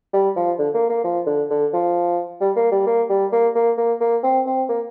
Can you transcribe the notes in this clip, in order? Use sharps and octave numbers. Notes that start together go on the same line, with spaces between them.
G3
F3
D3
A#3
A#3
F3
D3
D3
F3
G3
A#3
G3
A#3
G3
A#3
A#3
A#3
A#3
C4
C4
A#3